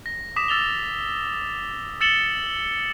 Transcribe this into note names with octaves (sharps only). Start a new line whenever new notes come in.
A#6
D6 D#6 B6 E7
E6 A6 F7 G7
E6 A6 C#7 E7 F#7 G7